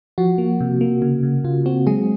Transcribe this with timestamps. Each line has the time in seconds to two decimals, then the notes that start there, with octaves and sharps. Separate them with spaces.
0.18 F3 F#4
0.38 A#3
0.61 C3
0.81 A#3
1.02 C#3
1.23 C#3
1.44 C#3 F4
1.66 C4 F#4
1.87 F#3 G#3 G#4